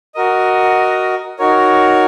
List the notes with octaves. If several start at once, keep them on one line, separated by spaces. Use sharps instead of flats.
F#4 A#4 D#5
D#4 F#4 A#4 C#5